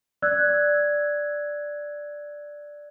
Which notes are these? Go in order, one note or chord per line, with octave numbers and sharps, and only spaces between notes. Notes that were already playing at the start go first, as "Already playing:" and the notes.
D5 E6 F#6 G#6